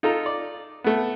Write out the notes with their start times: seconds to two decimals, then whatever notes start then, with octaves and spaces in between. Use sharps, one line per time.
0.03 D#4 F4 A4 A#5
0.26 D5
0.84 A3 B3